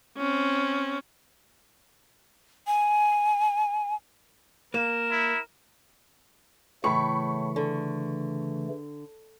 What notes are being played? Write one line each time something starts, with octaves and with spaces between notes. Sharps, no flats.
C4 C#4
G#5
A#3 A#4 E7
E4
A2 C#3 E3 A3 B5 C#6
D3